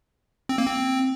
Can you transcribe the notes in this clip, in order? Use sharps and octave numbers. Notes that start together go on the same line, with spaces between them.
C4
A#3
C4